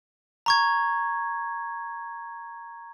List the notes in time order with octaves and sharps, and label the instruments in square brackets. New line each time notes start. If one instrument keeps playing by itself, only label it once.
[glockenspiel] A#5 C#6 G#6